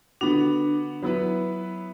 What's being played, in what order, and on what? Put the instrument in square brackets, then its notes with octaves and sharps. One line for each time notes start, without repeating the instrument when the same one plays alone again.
[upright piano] D3 B3 F#4 [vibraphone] D4
[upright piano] F#3 B3 E4 B4